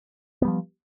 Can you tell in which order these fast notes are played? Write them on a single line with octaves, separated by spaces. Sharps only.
B3 G3 F3